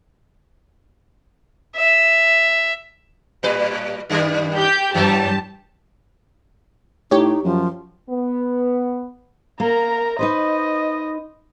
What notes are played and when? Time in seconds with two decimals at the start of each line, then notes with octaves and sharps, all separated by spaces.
1.76 E5
3.43 A2 G3 B4
4.10 F#2 D#3 G3
4.55 G4 G6
4.94 G2 E3 F#3 G3 G4 A5
7.11 A2 D#4 G4 C#5
7.44 F#2 F3
8.09 B3
9.60 A#3 A#4 A#5
10.19 D#4 B4 C5 D#5